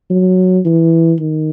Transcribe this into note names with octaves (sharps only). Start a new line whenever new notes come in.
F#3
E3
D#3